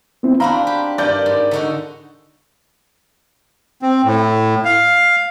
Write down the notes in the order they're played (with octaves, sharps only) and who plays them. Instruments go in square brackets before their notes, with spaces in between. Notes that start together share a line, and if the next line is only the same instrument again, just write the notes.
[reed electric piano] B3 C4 E4
[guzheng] C4 D4 F#4 [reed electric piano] F5 A#5 [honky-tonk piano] B5
[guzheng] G4
[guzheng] G2 A#4 [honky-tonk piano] D5 G6
[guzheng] G#2
D3 D#4 F#4
[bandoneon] C4
A2
F5